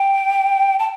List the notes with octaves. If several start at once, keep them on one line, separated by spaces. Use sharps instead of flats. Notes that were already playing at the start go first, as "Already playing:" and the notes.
Already playing: G5
A5